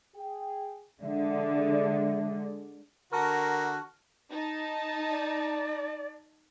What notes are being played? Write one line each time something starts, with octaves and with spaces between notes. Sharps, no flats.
G#4 G5
D3 G#3 E5
D3 F#4 A#4 A5 C#6 F6
D#4 A5
D5